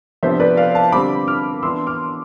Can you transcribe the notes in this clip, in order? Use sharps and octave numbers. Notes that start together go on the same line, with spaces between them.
C3 F3 B3 D4 C5 E5
B4 D5
D5 F5
F5 A5
D3 G3 C4 B5 D6
D6 F6
E3 B3 D4 C6 E6
D6 F6